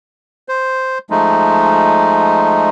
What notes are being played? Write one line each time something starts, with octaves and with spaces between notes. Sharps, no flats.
C5
F3 G#3 A3 D#4